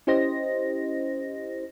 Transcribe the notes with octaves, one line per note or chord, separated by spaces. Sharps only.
C#4 E4 G4 C5 D#5 A#6